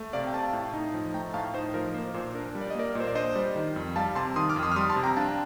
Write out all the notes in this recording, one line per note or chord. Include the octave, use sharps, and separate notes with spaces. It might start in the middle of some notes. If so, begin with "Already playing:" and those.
Already playing: A3
C3 D5 F5
G5
A3 F5 A5
A2
D#4
F3
A3 G5 A#5
A2 F5 A5
D#4 C5
F3 A#4
A#3 C5
A#2 C5
D4 A#4
G3
D5
D#5
A#3 A#4 D5
A#2
C5
D5
D4 C5 D#5
G3
D#3
F2
G3 F5 A5
C3 A5 C6
D#3 C6 D#6
D6 F6
F2
C6 D#6
F6
G3 C6 D#6
A5 C6
C3
G5 A#5
D4 F5 A5